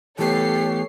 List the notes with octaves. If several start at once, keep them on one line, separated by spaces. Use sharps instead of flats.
E3 A3 B3 G4 A4 C#5 C7